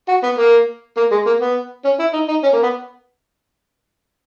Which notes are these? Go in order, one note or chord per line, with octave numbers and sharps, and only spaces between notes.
F#4
B3
A#3
A#3
G#3
A#3
B3
C#4
E4
D#4
D#4
C#4
A#3
B3